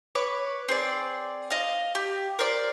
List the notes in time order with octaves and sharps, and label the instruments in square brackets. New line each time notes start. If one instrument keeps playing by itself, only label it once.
[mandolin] B4 C#5 D6
C4 G#4 D5
D#5 F5
G4
A#4 C5 D5 D6